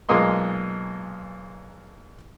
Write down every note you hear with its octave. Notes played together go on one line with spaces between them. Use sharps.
B1 A#2 G#3 A#3 D#5 C6